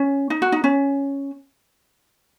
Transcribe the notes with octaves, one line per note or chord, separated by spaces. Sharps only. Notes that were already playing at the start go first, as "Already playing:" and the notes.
Already playing: C#4
D#4
F#4
D#4
C#4